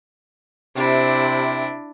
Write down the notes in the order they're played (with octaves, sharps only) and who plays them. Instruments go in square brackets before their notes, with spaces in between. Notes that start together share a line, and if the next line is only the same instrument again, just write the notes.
[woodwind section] C3 [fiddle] D4 E4